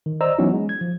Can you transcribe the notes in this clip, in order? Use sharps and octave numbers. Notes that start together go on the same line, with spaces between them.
D#3
C5 D5 D#5 A#5 E6
E3 F#3 B3 C#4 D#4 E4
G#3
G#6
F3